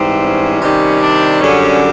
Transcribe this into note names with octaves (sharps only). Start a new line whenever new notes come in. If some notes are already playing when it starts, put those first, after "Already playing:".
Already playing: G#2 E3 G3 C4
C#4
C3 D#3 G3
D4
F#2 D3 G3 C#4